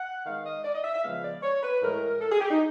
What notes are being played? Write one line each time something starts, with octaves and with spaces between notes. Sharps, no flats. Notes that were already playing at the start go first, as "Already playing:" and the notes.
Already playing: F#5
D#3 G#3 B3 F5
D#5
D5
D#5
E5
E5
C#3 F3 G#3 B3 F5
D5
C#5
B4
A2 E3 G#3 A#4
A4
G#4
G4
D#4